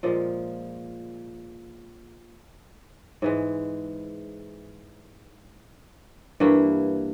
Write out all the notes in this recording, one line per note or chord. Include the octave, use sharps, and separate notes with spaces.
A#2 F3 G#3
G#2 E3 G#3
G2 E3 A#3 E4